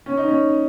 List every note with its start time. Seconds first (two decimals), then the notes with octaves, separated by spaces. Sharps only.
0.06 C#4
0.17 D#4
0.28 C#4